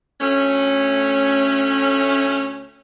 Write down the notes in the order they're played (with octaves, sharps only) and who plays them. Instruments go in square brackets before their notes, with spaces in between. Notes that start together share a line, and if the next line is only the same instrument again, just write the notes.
[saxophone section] D2 A3 C#4